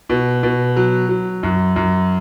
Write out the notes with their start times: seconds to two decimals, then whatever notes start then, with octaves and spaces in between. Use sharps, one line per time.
0.09 B2
0.43 B2
0.76 F#3
1.09 F#3
1.43 F#2
1.76 F#2